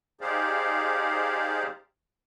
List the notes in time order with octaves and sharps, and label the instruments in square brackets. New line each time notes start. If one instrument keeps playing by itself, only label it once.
[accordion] D#4 G4 G#4 C5 D5 F5